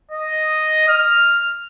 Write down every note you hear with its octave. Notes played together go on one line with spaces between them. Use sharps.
D#5
F6